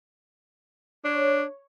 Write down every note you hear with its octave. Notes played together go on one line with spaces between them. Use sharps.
D4 C#5